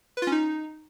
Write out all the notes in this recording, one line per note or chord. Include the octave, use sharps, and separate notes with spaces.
B4
F4
C#4
D#4